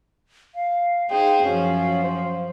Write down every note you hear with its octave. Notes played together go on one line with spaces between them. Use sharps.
F5
D#4 G#4 C5 F5 G5
F#2 F3 C#4
C5